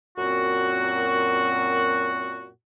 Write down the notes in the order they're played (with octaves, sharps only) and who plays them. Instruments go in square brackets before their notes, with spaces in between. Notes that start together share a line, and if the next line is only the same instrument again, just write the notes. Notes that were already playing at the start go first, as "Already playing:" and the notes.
[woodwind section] F#2 A#2 C4 F#4